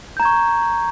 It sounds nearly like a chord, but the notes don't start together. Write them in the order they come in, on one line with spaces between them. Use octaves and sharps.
G6 A#5 G#6 C#6